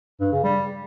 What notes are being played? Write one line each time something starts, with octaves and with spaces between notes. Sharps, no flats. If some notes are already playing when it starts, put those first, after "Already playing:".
G2
C#3
G3